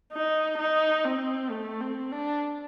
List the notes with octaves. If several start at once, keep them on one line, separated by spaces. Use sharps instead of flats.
D#4
D#4
C4
A3
C4
D4